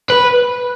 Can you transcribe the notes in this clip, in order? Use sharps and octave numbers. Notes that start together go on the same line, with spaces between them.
B4